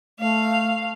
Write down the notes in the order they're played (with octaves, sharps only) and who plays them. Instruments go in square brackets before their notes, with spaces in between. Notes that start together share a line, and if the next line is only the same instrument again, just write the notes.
[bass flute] A3 [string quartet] F5